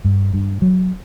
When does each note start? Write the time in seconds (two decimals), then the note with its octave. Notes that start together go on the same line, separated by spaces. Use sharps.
0.05 G2
0.34 G2
0.62 F#3